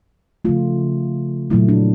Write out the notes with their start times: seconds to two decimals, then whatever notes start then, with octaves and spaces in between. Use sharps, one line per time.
0.45 C#3 F3 A3 F4
1.50 A#2 F#3 A3 E4
1.69 D4